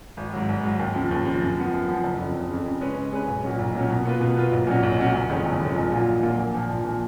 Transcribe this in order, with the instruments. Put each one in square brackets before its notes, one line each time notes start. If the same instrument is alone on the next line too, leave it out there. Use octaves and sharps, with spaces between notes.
[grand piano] G#1
G#2 F#3
G#1
G#2 F#3
D#2
C#3 F3
D#2
C#3 F3
F#2
F3 B3
F#2
F3 B3
F#1
F2 C#3
F#1
F2 C#3
C#3
G#3 C#4 G#4 B4
C#3
G#3 C#4 G#4 B4
B1
A#2 F#3 C#4
B1
A#2 F#3 C#4
B2
A#3 F4 B4
B2
A#3 F4 B4
B1
A#2 F#3 C#4 F#4
B1
A#2 F#3 C#4 F#4
F#1
F2 D#3 G#3 C#4
F#1
F2 D#3 G#3 C#4
A#1
A#2 F#3 A#3 F4
A#1
A#2 F#3 A#3 F4
A#1
A#2 F3 A#3
A#1
A#2 F3 A#3